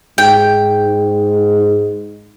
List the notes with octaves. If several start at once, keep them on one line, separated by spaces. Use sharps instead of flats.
G#2 G5